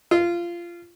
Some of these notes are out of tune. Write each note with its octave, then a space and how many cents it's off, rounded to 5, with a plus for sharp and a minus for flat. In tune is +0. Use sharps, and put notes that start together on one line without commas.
F4 -20